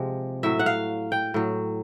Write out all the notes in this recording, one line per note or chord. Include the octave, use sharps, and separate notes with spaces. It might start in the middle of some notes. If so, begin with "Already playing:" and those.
Already playing: C3 F3 G#3
A2 F#3 E5
F#5
F5
G5
A2 F#3